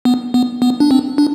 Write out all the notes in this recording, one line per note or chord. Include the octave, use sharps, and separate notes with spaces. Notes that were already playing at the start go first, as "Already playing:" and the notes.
B3
B3
B3
D4
C4
D4